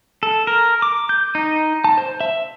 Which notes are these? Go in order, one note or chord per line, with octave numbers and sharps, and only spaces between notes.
A4
A#4
D6
G6
D#4
A5
C5
E5